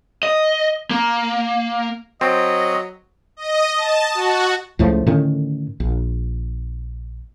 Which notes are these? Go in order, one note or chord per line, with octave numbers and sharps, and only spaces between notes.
D#5
A#3
F#3 C4 D#5
D#5
A5
F#4
C#2 A2 F3 A3
A2 D3 D#3 C#4
A#1